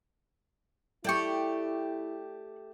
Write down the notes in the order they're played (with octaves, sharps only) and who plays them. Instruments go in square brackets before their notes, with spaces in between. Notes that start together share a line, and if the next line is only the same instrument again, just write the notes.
[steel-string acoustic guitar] A3 G4 [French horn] E4 [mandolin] D5 G5 C#6